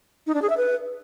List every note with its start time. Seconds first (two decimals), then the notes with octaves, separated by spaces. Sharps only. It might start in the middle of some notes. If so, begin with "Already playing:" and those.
0.27 D#4
0.34 D4
0.42 G#4
0.50 E5
0.57 B4